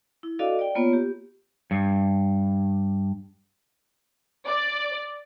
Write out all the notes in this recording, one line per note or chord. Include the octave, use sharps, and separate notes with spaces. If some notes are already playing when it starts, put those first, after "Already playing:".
E4
D4 F#4 A4 D5 D#5 F5
D5 G5
A#3 B3 F4 C#5
G4
G2
D5